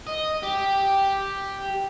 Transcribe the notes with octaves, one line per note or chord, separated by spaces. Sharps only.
D#5
G4